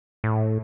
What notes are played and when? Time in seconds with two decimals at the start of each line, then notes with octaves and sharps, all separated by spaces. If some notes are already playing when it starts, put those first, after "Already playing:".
0.24 A2